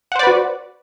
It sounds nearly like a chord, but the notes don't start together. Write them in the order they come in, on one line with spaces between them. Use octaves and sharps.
F#5 C5 D5 B4 F#4